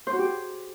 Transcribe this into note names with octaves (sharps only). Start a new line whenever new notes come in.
C5
F#4
G4
G#4